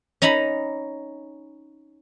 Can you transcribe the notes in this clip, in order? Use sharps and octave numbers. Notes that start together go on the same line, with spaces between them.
C#4 D#4 A#5 B5